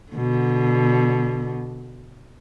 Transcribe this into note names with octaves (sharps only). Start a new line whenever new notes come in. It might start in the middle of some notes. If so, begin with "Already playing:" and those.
B2 D3